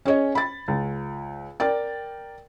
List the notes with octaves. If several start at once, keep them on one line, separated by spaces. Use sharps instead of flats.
C#4 G#4 C#5 D#5
B5 A6
C#2
A#4 D5 G5 A6